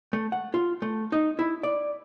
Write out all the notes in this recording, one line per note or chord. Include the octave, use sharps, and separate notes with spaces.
A3
F#5
F4
A3
D#4
E4
D5